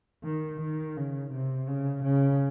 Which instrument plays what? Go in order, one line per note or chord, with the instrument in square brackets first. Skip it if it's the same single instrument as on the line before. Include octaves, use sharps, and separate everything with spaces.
[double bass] D#3
D#3
C#3
C3
C#3
C#3